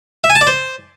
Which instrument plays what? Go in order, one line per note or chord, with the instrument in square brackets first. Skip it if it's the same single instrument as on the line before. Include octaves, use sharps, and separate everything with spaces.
[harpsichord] E5
G#5
A5
D5
C5